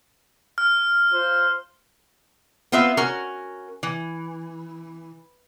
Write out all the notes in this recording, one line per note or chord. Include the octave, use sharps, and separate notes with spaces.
F6
F4 C5
B3 C4 F4 B4 E5
C#4 F#4 A#4
E3